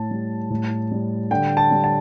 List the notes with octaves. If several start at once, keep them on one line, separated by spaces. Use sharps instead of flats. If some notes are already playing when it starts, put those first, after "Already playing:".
Already playing: A2 A5
G3
A2
G3
D3 G5
A5
G3
A5